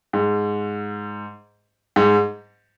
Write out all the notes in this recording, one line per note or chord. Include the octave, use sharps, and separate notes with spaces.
G#2
G#2